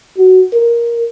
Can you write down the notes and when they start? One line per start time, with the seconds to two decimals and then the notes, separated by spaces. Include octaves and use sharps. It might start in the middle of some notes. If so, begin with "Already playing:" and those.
0.17 F#4
0.52 A#4